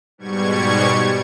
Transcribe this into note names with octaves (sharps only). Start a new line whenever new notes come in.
G#2 B2 G3 C#6 G#6